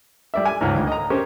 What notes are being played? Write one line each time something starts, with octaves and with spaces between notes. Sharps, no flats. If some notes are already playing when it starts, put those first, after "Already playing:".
G3 D5 E5
G#5
C#2 G#2
D2
D#5 A#5
C#4 G4 A#4 C5